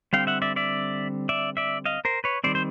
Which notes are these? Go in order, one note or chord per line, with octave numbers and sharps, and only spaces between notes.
D3 G3 C4 F5 G5
E5 F#5
D5 E5
D5 E5
D5 E5
D5 E5
D#5 F5
A#4 C5
B4 C#5
D#3 G3 C4 C5 D5
C5